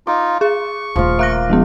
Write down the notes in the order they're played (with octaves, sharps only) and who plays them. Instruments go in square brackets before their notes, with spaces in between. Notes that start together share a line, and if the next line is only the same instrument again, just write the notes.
[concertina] D#4 F4 [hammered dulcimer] D6
[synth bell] G#4 [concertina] C#6
[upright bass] D#1 A3 [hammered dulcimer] F3 F4
[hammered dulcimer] A#3 [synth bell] E5 F#6 A#6
[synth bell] F3 G#3 B3